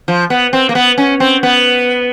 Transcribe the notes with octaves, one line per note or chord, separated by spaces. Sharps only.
F3
B3
C4
A#3
B3
C#4
C4
B3